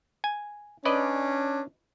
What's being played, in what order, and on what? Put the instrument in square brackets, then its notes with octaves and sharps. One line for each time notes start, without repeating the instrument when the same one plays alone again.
[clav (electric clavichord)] G#5
[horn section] C#4 D4 [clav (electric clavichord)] B4 D5 D#5